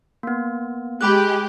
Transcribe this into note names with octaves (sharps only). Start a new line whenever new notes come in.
A#3 B3
G#3 G4 B5 D6 F#6